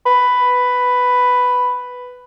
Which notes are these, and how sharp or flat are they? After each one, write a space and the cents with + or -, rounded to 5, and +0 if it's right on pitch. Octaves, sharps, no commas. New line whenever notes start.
B4 +5